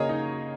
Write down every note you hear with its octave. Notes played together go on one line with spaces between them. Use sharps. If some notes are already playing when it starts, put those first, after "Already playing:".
Already playing: C#3 A#3 G#4 C#5 D#5 A#5
D#4